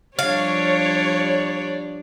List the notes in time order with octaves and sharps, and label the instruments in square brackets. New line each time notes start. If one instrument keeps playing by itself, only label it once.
[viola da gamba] F3 G3 D4 [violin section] C#5 [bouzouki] F5